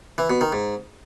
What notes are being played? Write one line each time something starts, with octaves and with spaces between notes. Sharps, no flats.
E3
B2
D#3
G#2